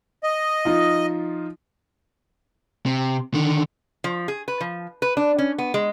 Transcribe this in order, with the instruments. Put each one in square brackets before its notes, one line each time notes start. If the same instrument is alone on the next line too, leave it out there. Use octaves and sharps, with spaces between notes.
[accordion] D#5
[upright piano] F3 D#4 F4
[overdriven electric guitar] C3
D3 D#3
[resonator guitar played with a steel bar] F3
G#4
B4
F3
B4
D4
C#4
B3
G#3